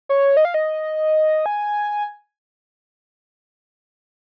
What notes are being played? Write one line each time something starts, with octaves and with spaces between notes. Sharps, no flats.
C#5
D#5
F5
D#5
G#5